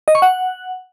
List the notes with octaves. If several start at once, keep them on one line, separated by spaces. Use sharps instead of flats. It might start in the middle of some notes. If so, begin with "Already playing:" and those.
D#5
C#6
F#5